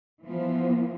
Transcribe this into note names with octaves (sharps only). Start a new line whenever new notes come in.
E3 F3 B3